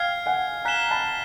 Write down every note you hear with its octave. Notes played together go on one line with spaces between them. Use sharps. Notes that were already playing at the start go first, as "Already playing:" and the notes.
Already playing: F5 G5 F6 G#6 C7
F#5 G#5
G#5 A#5 F#6 B6 E7 G7
A5 B5